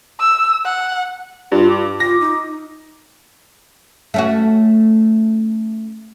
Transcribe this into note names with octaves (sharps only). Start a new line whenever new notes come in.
E6
F#5
G2 F4
D6
F4 A#6
D#4
A3 C#4 F#4